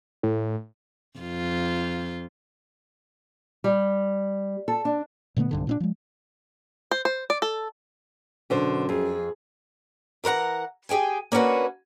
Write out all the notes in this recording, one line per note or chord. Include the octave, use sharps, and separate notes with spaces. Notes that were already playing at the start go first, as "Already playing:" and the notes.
A2
F2 F4
G3
A4
D4
A#2 D3 A3 B3
B1 G2 D3
A#2 C4 D4
F3 G#3
C5
C5
D5
A4
F#2 B2 D3 C5
F2 G#4
E3 A#4 B4 F#5 A#5
G4 G#4 G5 G#5
A#3 C#4 D4 F#4 B4